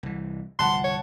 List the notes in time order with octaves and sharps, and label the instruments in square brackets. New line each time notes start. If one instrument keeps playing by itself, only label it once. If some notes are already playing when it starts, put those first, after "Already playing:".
[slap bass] C2 E3
[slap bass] G1 C2 F3 [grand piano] F#5 A5 F#6 [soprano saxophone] C6
[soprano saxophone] C#5